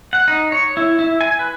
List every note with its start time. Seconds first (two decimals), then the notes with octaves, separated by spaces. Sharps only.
0.13 F#5
0.28 D#4
0.52 C#5
0.77 E4
0.99 E4
1.21 G#5
1.39 B4